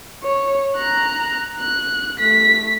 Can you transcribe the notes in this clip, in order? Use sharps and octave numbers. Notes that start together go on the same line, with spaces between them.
C#5
A#5 F#6
F#6
A3 B6